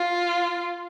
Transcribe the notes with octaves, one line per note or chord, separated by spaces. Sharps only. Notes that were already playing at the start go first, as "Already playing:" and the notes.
Already playing: F4